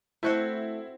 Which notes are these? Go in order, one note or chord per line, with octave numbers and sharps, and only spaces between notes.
A3 C4 E4 F#4 C5